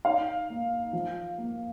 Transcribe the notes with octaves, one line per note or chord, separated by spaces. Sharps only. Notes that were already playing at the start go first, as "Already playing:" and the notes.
D#4 F5
A#3
F3
A#3